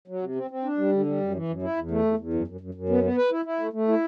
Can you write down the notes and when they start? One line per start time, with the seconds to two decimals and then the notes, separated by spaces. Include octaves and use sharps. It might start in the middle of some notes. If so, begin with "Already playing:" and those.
0.08 F#3
0.22 C3
0.36 C4
0.51 C4
0.64 D4
0.77 G3
0.92 D3
1.06 G3
1.20 F#2
1.34 E3
1.48 F#2
1.62 E4
1.76 E2
1.91 A3
2.05 E2
2.18 E2
2.33 F#2
2.48 F#2
2.61 F#2
2.75 F#2
2.89 B3
3.03 B3
3.17 B4
3.31 E4
3.45 E4
3.59 A3
3.73 A3
3.88 E4